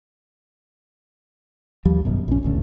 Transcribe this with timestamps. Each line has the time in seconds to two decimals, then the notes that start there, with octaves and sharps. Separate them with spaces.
1.85 D#2 F3 G3
2.05 G#1 F#2 B2
2.28 A#1 C#4
2.43 D#1 A1 D2